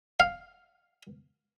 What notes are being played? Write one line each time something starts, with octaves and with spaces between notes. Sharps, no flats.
F5